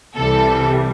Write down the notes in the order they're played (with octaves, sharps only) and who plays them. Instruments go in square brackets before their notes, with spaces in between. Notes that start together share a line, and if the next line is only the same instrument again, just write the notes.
[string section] C2 C3 E3 G3 A4